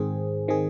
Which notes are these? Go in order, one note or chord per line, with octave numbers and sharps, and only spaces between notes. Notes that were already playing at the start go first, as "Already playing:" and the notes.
Already playing: G#2 D#3 C4 G#4
D#3 C4 G#4